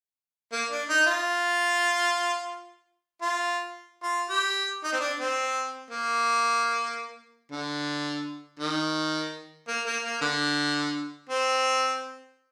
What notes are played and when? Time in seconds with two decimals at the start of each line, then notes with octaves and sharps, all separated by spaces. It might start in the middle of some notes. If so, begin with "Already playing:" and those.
0.52 A#3
0.71 D4
0.89 D#4
1.06 F4
3.22 F4
4.03 F4
4.29 G4
4.84 D#4
4.93 C4
5.01 D4
5.20 C4
5.91 A#3
7.52 D3
8.60 D#3
9.68 A#3
9.86 A#3
10.04 A#3
10.22 D3
11.30 C4